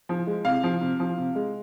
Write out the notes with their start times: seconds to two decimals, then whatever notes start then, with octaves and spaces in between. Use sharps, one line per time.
0.09 F3
0.27 G#3
0.45 C3 F5
0.63 F3
0.81 C3
1.00 F3
1.18 C3
1.35 G#3